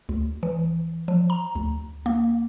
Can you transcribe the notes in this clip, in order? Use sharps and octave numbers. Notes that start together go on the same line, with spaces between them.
D2
E3
F3
A#5
D2
A#3